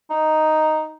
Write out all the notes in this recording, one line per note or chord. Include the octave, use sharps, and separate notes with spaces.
D#4